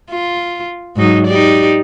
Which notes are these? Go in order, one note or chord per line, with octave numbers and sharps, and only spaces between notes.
F4
G#2 F#3 D#4
D#4 G4 D5